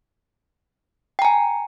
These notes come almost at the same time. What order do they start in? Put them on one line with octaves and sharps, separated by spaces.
G5 A#5 G#5